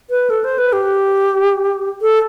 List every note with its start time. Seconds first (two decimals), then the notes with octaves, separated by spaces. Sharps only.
0.10 B4
0.30 A4
0.44 C5
0.58 B4
0.73 G4
2.02 A4